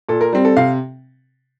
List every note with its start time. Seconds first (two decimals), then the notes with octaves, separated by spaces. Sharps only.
0.09 A#2 A4
0.21 A#4
0.33 G3 C4
0.45 A4
0.57 C3 F5